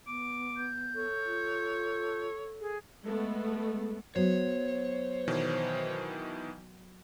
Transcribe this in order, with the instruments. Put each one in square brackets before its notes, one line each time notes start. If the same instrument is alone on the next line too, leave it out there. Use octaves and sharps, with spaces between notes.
[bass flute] B3 [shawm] D6
[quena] G6
[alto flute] A4 [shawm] C#5
[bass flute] F4
[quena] G#4
[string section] G#3 A3 B3
[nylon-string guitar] F#3 B3 [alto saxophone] C5 [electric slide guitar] C#5
[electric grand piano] B2 D#3 E3